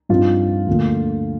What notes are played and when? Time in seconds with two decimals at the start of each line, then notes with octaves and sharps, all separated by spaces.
0.09 G2 F3 C4 D#4 F4
0.67 D2 D3 F3 A#3